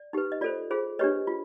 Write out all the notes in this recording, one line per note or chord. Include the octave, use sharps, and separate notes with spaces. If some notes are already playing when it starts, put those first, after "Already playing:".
Already playing: D5
D#4 G4 B4
D#5
F4 A4 C5 D5
F4 G#4 C5
D4 G4 B4 C#5 D#5
F4